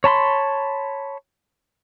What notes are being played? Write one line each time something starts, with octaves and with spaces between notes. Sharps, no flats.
C#5 A5 B5 C6